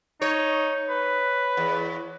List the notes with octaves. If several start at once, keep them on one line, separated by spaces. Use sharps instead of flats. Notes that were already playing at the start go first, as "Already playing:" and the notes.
D#4 C#5
B4
E2